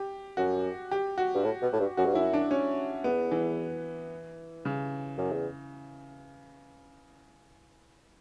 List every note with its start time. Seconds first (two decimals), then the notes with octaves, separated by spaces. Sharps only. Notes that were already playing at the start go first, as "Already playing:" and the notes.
Already playing: G4
0.37 F#2 F#4
0.91 G4
1.18 F#4
1.34 G2
1.44 A2
1.62 B2
1.73 A2
1.80 G2
1.97 F#2 F#4
2.05 G2
2.14 F#2 E4
2.33 D4
2.51 C#4
3.04 E2 B3
3.31 E3
4.65 C#3
5.18 F#2
5.32 E2